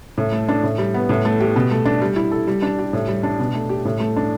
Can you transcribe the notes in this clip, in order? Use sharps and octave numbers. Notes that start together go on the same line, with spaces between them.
A2
A3
D4
A2
G3
B3
A2
A3
G4
B2
A3
D4
G3
E4
A4
G3
D4
G4
A2
G3
D4
B2
A3
G4
A2
A3
D4